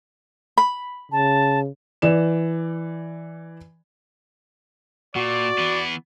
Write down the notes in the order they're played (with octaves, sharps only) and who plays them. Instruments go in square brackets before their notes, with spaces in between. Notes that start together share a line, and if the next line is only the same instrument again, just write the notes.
[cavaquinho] B5
[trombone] C#3 [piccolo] A5
[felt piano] E3 D5 E7
[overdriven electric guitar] A#2 [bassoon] F#4 [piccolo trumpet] D5
[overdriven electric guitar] E3 B3